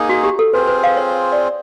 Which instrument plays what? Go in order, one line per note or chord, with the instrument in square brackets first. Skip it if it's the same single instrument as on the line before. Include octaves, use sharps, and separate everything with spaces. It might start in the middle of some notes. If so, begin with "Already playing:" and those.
Already playing: [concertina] A#3 D#4 G#4
[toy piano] F#4
G4
A4
[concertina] C4 F4 G#4 C5 [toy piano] B4
[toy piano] B4
F5
C#5
C#5
D5